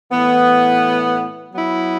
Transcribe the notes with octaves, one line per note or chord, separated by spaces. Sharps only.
A2 E3 B3
F#3 B3 E4